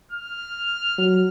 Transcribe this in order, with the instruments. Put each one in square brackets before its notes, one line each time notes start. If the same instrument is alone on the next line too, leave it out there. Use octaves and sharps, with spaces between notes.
[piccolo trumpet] F6
[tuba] F#3